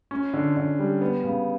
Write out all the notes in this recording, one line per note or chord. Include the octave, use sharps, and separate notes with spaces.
C#4
D3
D3
G3
B3
C#3